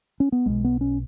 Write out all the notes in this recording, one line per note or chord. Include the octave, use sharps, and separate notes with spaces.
C#4
B3
B1 B2 G#3
B3
C#4